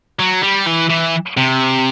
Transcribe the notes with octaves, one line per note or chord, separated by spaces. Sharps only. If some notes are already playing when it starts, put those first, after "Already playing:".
F#3
G3
E3
E3
C3